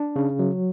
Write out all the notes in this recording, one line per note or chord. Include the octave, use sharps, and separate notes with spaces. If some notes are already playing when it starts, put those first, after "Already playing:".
Already playing: D4
C#3
F#3